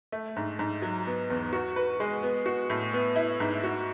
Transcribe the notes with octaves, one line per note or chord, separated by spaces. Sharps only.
A3
G#2
G#2
F#3
B3
E2
F#4
B4
G#3
B3
F#4
A2
B3
E4
G#2
F#4